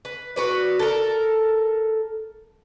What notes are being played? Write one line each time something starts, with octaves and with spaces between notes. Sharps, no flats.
B4
F#4 B4 D5
A4 A#4